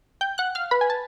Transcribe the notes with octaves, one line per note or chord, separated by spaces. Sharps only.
G5 G6
F#5 F#6
F5 F6
B4 B5
G#5
A5